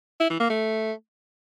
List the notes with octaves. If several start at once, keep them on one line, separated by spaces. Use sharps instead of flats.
E4
E3
A#3
A3